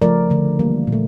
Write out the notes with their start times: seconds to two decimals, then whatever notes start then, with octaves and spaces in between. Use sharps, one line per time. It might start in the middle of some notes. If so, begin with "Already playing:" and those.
0.02 C#3 F3 A3 A#4 D5
0.30 D3 A3
0.59 E3 G3 A#3
0.87 A#2
0.92 A3